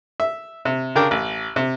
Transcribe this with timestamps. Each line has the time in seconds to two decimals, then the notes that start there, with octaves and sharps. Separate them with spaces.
0.20 E5
0.65 C3
0.96 C#3 D4 A#4 G5 D6
1.11 A1
1.56 C3